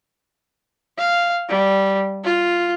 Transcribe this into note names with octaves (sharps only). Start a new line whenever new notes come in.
F5
G3
F4